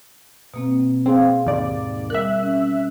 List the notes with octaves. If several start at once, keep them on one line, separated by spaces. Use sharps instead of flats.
B2 A#3 C4
C4 G#4 F5
D#2 G#2 D5
G3 A#4 E5 F#6
C#4